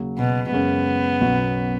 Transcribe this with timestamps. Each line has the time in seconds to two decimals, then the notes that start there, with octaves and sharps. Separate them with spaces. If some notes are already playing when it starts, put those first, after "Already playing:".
Already playing: D#2 C#3 F#3
0.18 B2
0.52 F#2 C#3 G#3 B3 C#4
1.21 B1 B2 F#3 C#4 F#4